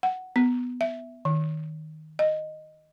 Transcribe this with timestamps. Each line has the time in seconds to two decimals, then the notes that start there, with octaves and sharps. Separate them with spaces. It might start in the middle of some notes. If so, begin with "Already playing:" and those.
0.03 F#5
0.36 B3
0.81 E5
1.25 D#3
2.19 D#5